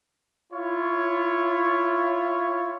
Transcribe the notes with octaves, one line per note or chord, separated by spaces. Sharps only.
E4 F4 C#5